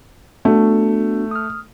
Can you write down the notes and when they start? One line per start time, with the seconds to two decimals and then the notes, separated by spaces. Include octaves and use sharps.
0.45 A3 B3 D4 F#4
1.31 D#6 F6